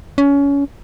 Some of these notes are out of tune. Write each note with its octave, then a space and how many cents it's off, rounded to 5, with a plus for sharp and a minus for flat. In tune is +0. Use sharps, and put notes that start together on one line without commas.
C#4 +25